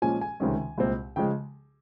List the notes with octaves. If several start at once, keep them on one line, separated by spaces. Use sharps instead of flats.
A#2 F3 G#3 C#4 G#5
G#5
C#2 C3 D#3 G#3 C#4
C2 A#2 G#3 C4
C#3 F3 G#3 G5